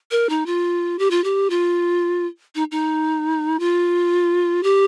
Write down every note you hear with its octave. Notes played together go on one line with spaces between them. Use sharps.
A#4
D#4
F4
G4
F4
G4
F4
D#4
D#4
F4
G4